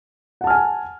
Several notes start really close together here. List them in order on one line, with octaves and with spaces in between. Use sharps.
F#5 A5 F6 G#5